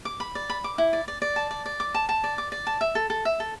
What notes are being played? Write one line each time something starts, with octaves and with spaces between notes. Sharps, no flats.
D6
B5
D5
B5
D6
E4
D5
D5
D5
A5
D5
D5
D6
A5
A5
D5
D6
D5
A5
E5
A4
A4
E5
A4